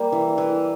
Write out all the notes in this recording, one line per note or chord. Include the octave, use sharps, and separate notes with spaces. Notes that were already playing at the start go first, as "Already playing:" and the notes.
Already playing: G3 A#3
E3
E3